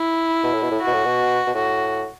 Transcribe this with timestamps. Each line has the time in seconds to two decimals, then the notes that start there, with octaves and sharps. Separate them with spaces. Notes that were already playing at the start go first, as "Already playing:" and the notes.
Already playing: E4
0.43 B2
0.53 A2
0.62 B2
0.71 A2
0.81 F#4
0.87 B2
0.94 A2
1.05 B2
1.47 B2
1.55 A2 F#4